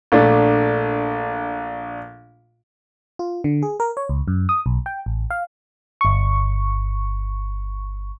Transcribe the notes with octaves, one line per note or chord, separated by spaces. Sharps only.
A#1 A3 D4
F4
D3
G#4
A#4
C#5
C#2
F#2
D#6
B1
G5
A1
F5
G1 C#6